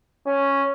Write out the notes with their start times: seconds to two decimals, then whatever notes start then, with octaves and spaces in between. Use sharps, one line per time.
0.27 C#4